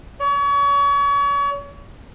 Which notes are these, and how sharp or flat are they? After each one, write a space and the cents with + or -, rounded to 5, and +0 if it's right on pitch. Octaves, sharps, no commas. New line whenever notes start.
C#5 +35